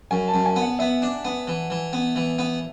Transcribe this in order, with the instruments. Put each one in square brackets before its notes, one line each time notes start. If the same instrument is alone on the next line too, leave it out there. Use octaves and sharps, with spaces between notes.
[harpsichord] F#2 [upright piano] G#5
[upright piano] A5
[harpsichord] F#2
[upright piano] G#5
[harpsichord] B3
[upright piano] F#5
[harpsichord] B3 [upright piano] E5
[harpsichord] D4
B3
E3
E3
B3
E3
B3